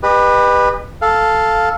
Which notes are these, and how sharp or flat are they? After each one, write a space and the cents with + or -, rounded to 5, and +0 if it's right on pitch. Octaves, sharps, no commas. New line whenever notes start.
G4 +30 B4 -5 D#5 -35
A4 +0 F5 +0